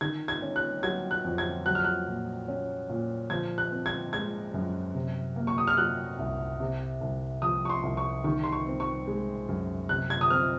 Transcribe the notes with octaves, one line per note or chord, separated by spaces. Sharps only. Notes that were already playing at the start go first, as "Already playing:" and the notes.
D#3 G#6
G#6
C#4
F#6
F#3 G#6
F#6
F2
G#6
F#3 F#6
F6
F#6
A#2
C#4
A#2
F3 G#6
F#6
C4
G#6
G#3 G#6
F#2
C3
A#3
C#6
D#6
F6
F#3 F#6
C2
C3
C2
F3 D#6
C#6
C6
C2
C#6
D#3 C#6
C6
C#6
C4
C#6
G#3
F#2
C3 F#6
G#6
D#6
C4 F6